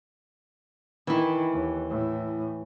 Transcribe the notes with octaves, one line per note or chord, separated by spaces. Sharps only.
D#3 E3 E4
D#2
A2